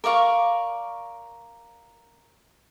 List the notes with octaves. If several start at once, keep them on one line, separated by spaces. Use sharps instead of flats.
A#4 D5 F5 C#6